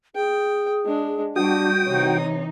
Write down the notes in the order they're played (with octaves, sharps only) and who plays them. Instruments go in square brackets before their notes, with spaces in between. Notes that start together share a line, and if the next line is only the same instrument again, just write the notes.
[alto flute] G#4 [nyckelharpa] G5
[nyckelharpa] G#3 D4
[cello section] G3 [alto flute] D4 [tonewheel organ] F#4 G5 [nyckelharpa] D#6
[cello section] C3 E3 D#4 [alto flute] C#5